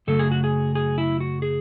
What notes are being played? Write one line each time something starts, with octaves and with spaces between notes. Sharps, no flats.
F#2 C#3 F#3 A3 A4
G#4
F#4
G#4
G#4
E4
F#4
G#4